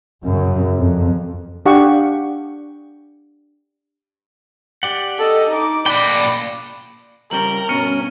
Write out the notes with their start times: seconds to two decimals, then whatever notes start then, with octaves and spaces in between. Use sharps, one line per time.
0.24 F#2 C#3
0.77 F2
1.66 D4 G4 F5 F#5 C#6
4.83 G4 D5 F#5
5.18 A4 D#5
5.50 D#4 D6
5.86 A#2 D5 G5 B5 F#6
7.31 C#2 G3 C#4 A#4 F#7 G7
7.69 G2 B2 C#4 F6 C#7 D#7